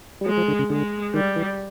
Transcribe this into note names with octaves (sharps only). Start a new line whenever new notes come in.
G3
F#3 G#3
F3
D3
C#3
D3 G#3
D#3 G3
E3